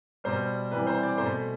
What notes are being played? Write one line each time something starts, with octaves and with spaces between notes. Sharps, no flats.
B2 G3 C5
C3 E3 G3 B4
C5
D5
B2 A3 C5